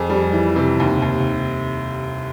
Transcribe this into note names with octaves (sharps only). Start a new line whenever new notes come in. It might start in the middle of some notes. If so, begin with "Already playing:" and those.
Already playing: F2 G#4
G3
E3
C3
D#2
D#2